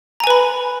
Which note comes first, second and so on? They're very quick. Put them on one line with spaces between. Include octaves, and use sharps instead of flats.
A#5 G#5 B4 B5